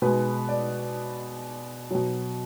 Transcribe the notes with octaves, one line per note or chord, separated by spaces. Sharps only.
B2 G#3 B4
D5
B2 F#3